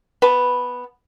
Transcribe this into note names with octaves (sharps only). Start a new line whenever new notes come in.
B3 B4 A5